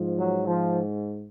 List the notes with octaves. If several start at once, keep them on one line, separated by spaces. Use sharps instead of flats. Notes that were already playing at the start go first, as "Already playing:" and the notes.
Already playing: G#2 F3
F#3
F3